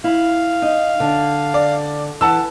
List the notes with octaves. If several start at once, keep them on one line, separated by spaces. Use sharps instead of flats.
E4 F5
D#4
D3
D5
E3 F#5 A5 E6